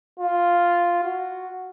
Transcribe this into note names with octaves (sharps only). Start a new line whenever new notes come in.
F4
F#4